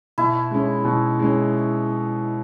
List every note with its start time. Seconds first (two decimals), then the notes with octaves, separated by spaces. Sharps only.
0.18 B2 E4
0.51 G#3 C#4
0.85 B2
1.19 G#3 C#4